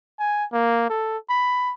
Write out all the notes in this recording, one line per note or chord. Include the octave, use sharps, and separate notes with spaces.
G#5
A#3
A4
B5